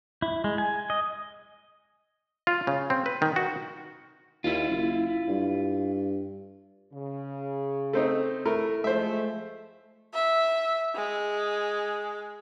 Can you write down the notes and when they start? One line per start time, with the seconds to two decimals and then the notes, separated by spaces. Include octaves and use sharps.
0.22 E4
0.44 G#3
0.58 G#5
0.90 D#5
2.47 F4
2.67 C#3
2.90 C4
3.06 B4
3.22 D#3
3.36 F#4
4.44 D#2 E4 F4
4.70 F#1
5.28 G2
6.93 C#3
7.93 A3 C4 D#4
8.45 A3 E4 A#4
8.84 F3 G#3 A3 C5 E5
10.14 E5
10.95 G#3